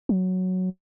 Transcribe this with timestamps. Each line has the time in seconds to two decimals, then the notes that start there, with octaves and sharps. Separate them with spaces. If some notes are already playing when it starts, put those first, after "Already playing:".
0.09 F#3